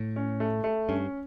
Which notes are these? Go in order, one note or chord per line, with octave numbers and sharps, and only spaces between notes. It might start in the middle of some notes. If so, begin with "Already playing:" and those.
Already playing: A2
C#4
A3
A3
G2 C#4